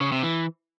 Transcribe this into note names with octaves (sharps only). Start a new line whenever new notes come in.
C#3
C3
E3